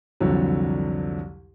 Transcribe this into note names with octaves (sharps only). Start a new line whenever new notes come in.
C2 F2 D3 F#3